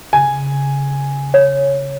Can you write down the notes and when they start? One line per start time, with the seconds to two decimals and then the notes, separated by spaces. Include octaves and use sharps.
0.13 C#3 G#5
1.34 C#5